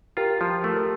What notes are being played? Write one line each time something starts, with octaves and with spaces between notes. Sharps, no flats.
F4 G4 A#4
F3
A3
A#4